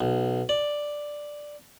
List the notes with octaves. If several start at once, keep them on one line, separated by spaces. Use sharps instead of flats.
B1
D5